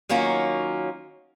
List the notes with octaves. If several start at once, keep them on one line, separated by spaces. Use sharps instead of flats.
D#3 F#3 A#3 C#4 F4